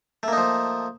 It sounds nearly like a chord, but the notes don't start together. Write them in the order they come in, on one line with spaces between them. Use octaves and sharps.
A3 A#3 D#4 F3